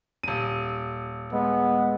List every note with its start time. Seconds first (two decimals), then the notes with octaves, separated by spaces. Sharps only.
0.23 D#1 D#7
1.33 G#3 B3